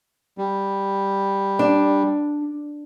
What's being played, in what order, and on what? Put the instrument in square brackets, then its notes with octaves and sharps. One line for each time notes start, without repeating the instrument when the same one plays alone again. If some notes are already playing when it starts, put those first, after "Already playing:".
[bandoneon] G3
[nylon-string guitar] D4